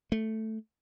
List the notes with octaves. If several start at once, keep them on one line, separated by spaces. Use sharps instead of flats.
A3